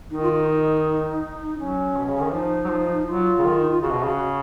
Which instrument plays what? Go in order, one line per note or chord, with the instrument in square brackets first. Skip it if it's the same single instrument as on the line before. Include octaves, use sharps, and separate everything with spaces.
[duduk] D#3 [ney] D#4
[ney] F4
D#4
[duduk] F#3 [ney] C#4
[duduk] B2
C#3
D#3
[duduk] F3 [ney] D#4
[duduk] F#3
F3
[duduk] F#3 [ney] F4
[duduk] C#3
D#3
[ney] D#4
F4
[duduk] C#3 [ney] F#4
[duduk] B2
[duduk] C#3 [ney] F#4